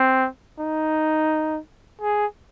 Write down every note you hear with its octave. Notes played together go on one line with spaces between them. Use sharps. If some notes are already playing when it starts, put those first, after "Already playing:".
Already playing: C4
D#4
G#4